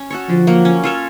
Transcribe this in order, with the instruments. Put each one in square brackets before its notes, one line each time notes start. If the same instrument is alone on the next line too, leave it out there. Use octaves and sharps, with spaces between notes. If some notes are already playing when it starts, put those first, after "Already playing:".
Already playing: [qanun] C#4
F#4 A4 C#5
[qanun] D3 [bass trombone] F3
[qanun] F#3 A#3
C#4
F4 A4 C#5